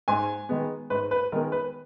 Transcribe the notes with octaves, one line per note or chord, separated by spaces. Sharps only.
G#2 G#5
D#3 G#3 B3
G#2 B4
B4
D#3 G#3 B3 A#4
B4